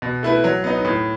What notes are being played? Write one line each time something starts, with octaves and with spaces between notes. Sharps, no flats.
B2
A3 E4 B4
F#3
B3 D#4
A2